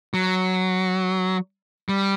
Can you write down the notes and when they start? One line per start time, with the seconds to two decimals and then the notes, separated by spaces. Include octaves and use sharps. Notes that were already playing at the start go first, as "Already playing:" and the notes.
0.14 F#3
1.89 G3